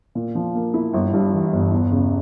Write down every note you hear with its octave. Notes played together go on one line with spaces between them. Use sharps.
A#2
F3
A#3
E4
G1
G2
E3
G1
E2
C#3